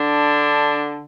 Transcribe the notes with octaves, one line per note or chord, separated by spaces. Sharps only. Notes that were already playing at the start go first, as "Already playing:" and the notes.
Already playing: D3 D4